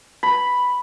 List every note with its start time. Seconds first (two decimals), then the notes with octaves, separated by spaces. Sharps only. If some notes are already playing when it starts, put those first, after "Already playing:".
0.23 B5